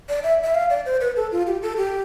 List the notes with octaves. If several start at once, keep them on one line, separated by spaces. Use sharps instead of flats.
D5
E5
E5
F5
D5
C5
B4
A4
F4
G4
A4
G4